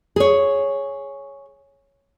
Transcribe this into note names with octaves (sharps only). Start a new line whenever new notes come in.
G#4 C#5